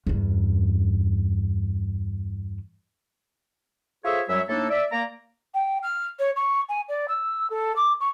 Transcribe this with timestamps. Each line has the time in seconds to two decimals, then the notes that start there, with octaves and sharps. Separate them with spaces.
0.07 E2 G2
4.05 F4 G#4 A4 C5 C#5 E5
4.29 F#2 F#3 G3 C#5 E5
4.49 A2 A#3 D4 D#4 A4
4.70 D5 E5
4.92 A#3 D5 A#5
5.54 G5
5.83 F6
6.19 C#5
6.36 C#6
6.69 G#5
6.88 D5
7.08 E6
7.50 A4
7.76 D6
8.00 C#6